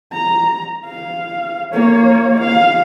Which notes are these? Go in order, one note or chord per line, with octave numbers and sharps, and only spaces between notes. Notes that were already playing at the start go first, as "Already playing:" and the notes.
A#5
F5
A#3 C#5
F5